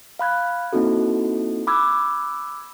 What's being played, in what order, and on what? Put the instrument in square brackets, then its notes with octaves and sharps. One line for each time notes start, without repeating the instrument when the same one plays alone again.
[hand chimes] F5 B5 F#6 G#6
A#3 C4 D#4 E4 F#4 A4
B5 D6 E6 F#6 G#6